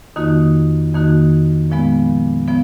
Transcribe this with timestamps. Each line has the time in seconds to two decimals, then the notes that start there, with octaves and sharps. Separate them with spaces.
0.16 F2 D#3 A#3 D#4 F#4
0.94 F2 D#3 A#3 D#4 F#4
1.70 A#2 F3 G#3 B3
2.48 F3 B3